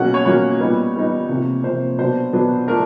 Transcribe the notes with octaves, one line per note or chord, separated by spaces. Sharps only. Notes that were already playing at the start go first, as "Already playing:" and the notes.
Already playing: B2 F#3 A#3 C#4 F#5
C#5
B2 F#3 A#3 C#4 C#5
A#2 G3 B3 D#4
A#2 G3 B3 D#4
C3 F3 A#3
C3 F3 A#3 C5
B2 F#3 B3 D4 C5
B2 F#3 B3 D4
F3 A3 D4 A#4